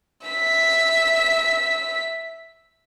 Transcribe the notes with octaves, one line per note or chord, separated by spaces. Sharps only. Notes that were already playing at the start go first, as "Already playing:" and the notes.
E5 B6